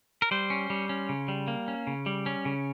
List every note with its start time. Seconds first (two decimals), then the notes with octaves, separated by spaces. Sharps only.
0.22 A#4
0.31 G3 C5
0.50 C#4
0.70 G3
0.89 C#4
1.09 C#3
1.28 G3
1.48 A#3
1.68 C#4
1.87 C#3
2.06 G3
2.26 C#4
2.45 C#3